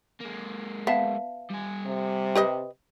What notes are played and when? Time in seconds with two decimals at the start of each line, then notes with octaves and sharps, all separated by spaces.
0.21 G#3 A#3
0.87 B3 E5 F5 A5
1.50 G3 G#5
1.86 C3
2.35 G4 B4 D#5